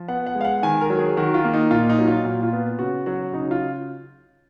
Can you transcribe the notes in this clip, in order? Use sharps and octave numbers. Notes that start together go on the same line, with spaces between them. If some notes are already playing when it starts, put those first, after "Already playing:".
Already playing: F3
B3 F#5
F#5
G#3
F5
F#5
D#3 G#5
A#4
F#3
G#4
D#3 F#4
F4
A#3
D#4
A#2 F4
D#4
F#3
F4
A#2 F4
F4
B3
C#3 F#4
F#3 F#4
C#3 D#4
F4